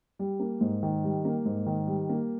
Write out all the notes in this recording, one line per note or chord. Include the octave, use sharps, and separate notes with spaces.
G3
A#3
G#2
D#3
G3
A#3
G#2
D#3
G3
A#3